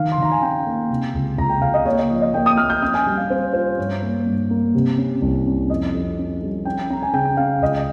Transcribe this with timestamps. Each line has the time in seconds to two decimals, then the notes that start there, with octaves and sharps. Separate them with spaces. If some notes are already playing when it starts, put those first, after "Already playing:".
Already playing: D#3 F5
0.12 C6
0.18 D#3 A#5
0.32 G#5
0.42 C#4 G5
0.66 A#3
0.90 C3
1.14 C#2
1.37 C#2 A#5
1.50 G5
1.62 C#2 F5
1.74 D#5
1.85 A#3 C#5
1.98 D#5
2.09 F3
2.21 D#5
2.34 A#3 G5
2.46 D#6
2.57 A#3 F6
2.70 G6
2.82 C#4 F6
2.94 G#5
3.06 G3
3.18 F5
3.30 C#4 C5
3.53 F4 C5
3.77 G2 C#5
4.02 A#3
4.26 G2
4.50 A#3
4.75 C3
4.98 C#4
5.22 C2
5.46 C#4
5.70 F2 D#5
5.93 F2
6.18 C#4
6.42 G3
6.65 C#4 G5
6.90 C#4 A#5
7.02 G#5
7.13 C#3 G5
7.37 C#4 F5
7.62 C#2 D#5